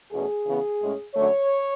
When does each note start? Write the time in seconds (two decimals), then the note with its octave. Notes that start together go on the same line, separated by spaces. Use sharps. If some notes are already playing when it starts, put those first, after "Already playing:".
0.11 E2 B2 A3 C#4 G#4
0.46 C#3 E3 B3
0.80 A2 G#3 C#4
1.14 F#2 D3 A3 C#5